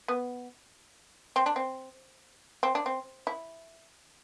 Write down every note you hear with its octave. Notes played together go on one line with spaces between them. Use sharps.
B3
C4
D4
C4
C4
D4
C4
E4